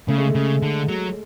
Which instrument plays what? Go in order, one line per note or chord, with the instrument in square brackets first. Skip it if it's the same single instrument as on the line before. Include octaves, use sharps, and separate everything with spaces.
[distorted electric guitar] C#3 [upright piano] A3
[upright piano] G#3
A3
[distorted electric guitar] C#3
D3
[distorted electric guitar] F#3 [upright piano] A3